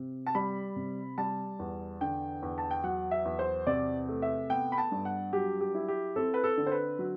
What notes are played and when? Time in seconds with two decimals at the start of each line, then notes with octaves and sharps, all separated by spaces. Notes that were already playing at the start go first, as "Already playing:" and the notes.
Already playing: C3
0.27 A5
0.35 G3 B5
0.76 C3
1.18 G3 A5
1.59 E2
2.01 D3 G5
2.42 E2
2.58 A5
2.71 G5
2.84 F#3 F#5
3.11 E5
3.25 E2
3.39 C5
3.67 C3 D5
4.08 A3
4.22 E5
4.50 B3 G5
4.72 B5
4.78 A5
4.92 G2
5.05 F#5
5.33 F#3 G4
5.61 G4
5.75 E4
5.88 G4
6.16 C4 A4
6.34 B4
6.44 A4
6.57 D3
6.67 C5
6.71 B4
6.99 F#3